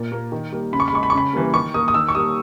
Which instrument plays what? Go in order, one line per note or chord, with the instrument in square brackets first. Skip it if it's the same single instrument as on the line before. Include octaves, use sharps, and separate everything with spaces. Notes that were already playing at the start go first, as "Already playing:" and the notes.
Already playing: [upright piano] A#2
A#3
D#3
G3 A#3
C#3 B5
C#6
B5
G#3 C#6
B5
C#6
C#3 B5
E3 G3 A#3
D#3 C#6
A#3 D#6
D#6
D#3 E6
C#6
G3 A#3 D#6